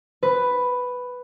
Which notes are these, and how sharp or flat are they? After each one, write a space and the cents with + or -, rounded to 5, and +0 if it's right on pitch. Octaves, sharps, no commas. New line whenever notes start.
B4 +5